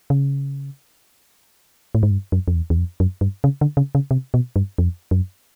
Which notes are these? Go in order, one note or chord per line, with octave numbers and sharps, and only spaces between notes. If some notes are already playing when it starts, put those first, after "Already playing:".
C#3
A2
G#2
G2
F#2
F2
E2
E2
F2
F#2
G2
C#3
D3
C#3
C#3
C3
B2
G2
F2
F#2